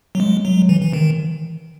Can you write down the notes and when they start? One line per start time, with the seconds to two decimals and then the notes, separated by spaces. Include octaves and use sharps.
0.15 F#3
0.20 G#3
0.45 F#3
0.69 E3
0.81 E3
0.93 D#3